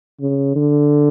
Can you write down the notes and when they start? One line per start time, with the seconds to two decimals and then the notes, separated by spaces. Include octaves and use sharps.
0.20 C#3
0.55 D3